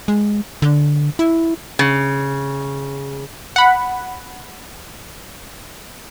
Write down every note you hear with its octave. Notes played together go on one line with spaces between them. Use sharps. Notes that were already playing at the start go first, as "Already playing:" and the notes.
G#3
D3
E4
C#3
F#5 B5